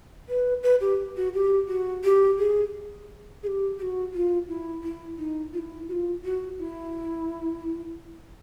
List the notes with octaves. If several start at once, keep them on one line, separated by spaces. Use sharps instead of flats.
B4
B4
G4
F#4
G4
F#4
G4
G#4
G#4
G4
G4
F#4
F4
E4
E4
D#4
F4
E4
F#4
F4
F#4
E4